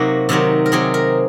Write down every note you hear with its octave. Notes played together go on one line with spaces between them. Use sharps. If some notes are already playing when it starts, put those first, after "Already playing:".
Already playing: C3 F#3 A#3 D#4 F#4
C3 D#3 F#3 C4
A#4
C3 F#3 C4 G#4
A#4